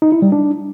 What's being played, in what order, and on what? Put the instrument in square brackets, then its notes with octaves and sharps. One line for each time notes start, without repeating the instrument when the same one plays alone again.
[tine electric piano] D#4
E4
G3
D4